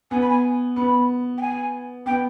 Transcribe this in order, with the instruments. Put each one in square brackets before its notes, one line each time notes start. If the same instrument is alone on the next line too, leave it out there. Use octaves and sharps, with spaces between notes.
[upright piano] B3 [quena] G#5
[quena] B5
G#5
[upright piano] B3 [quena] B5
[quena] G5
G#5
[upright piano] B3 [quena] G5